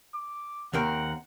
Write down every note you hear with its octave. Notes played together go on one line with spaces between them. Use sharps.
D6
D#2 C4 A#4 F#5